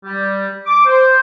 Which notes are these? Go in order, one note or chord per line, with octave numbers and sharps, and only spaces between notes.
G3
D6
C5